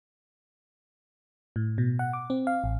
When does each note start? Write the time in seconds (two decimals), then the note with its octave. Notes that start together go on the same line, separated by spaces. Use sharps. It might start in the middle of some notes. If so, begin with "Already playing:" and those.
1.56 A2
1.78 B2
1.99 F#5
2.13 D6
2.30 C4
2.47 F5
2.64 A1